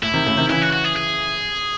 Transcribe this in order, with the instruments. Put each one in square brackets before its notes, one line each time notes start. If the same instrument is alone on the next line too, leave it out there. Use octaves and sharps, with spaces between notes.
[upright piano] A2 [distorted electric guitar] E4
[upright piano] C3 D#3
A2 C#3
C3 D#3
[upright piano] C#3 E3 [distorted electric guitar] E4
[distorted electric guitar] F#4
F#4
G#4
G#4